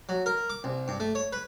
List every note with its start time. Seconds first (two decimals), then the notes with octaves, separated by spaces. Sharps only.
0.09 F#3
0.26 A#4
0.50 D6
0.64 C2
0.88 G2
1.00 A3
1.15 C#5
1.33 B4